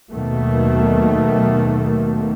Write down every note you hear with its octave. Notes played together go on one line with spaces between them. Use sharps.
D#2 B2 D#3 F#3 A3 A#3